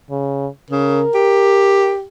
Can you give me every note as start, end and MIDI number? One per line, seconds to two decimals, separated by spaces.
0.10 0.47 49
0.70 1.05 49
0.70 1.92 70
1.15 2.05 67